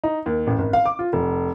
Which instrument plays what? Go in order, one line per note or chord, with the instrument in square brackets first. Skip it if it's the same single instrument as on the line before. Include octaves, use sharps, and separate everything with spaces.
[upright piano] D#4
D#2
A1
G#1
F5
D6
F4
F1